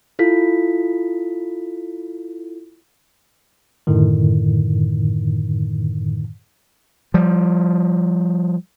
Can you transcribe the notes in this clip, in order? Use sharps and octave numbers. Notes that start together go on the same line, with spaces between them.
E4 F4 A4 B6
F#2 A2 D3 D#3
F3 G3